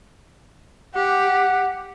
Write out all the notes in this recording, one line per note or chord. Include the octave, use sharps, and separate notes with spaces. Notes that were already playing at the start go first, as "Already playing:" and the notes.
G4 F#5